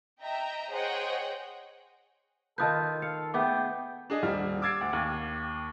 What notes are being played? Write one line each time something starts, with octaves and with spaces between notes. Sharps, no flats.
D#5 E5 G5 A#5
G#4 C5 C#5 D#5 F#5 G5
D#3 F4 A4 B4 A5 D#6 G6
F5 C#7
A3 B3 G#4 G5 D6
D4 G#4 D#5
D#1 G3 F6
D6 E6 G#6 A6 C7 D7
D2
D#2